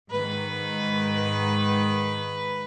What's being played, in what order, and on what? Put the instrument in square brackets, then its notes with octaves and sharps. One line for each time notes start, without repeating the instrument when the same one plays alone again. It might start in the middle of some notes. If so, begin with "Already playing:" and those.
[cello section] G#2 D#3 [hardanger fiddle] B4